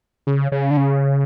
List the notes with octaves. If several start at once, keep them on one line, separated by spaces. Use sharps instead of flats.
C#3
C#3
D3
C#3